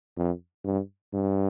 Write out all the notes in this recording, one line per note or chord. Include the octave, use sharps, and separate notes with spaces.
F2
G2
G2